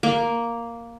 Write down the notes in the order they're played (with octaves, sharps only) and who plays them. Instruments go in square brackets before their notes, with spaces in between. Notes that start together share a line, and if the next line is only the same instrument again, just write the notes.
[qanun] A#3